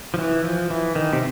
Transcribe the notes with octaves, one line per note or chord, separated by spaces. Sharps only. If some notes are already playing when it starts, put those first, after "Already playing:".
F3
E3
F3
E3
D#3
C3